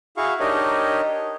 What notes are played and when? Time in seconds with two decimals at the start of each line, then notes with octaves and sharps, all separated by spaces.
0.17 E4 F#4 G#4 F5 C#6
0.40 D4 D#4 G4 A#4 C#5 D#5